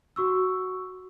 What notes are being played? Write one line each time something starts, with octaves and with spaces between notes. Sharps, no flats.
F#4 C#6 E6